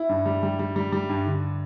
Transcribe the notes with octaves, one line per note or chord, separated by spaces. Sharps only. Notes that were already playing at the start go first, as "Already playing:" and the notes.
Already playing: E4
G2
G3
G3
G3
G3
G3
G2
D3